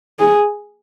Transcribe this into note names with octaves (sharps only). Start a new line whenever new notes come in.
G#4